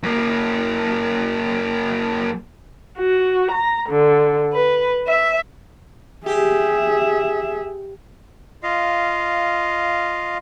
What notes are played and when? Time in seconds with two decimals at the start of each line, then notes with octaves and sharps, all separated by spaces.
0.03 F#2 A#3
2.98 F#4
3.53 A#5
3.91 D3
4.53 B4
5.08 E5
6.26 G4 G#4 E5
8.63 F4 D#5 F5